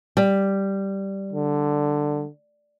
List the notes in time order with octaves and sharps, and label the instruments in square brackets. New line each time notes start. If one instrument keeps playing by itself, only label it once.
[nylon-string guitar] G3
[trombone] D3